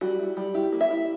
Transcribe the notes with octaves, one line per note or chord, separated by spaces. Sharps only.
G3 F#4
E4
G3
E4 G4
A#3
E5
E4